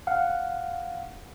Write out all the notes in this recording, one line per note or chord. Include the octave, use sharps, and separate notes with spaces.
F5 F#5